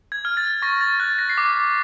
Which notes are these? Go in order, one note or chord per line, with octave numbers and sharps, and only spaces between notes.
G#6
F6
A6
C#6 A#6
A6
F#6 A6
A#6
C7
D6 B6